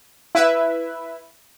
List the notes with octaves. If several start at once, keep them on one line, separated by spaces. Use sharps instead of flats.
E4 B4 E5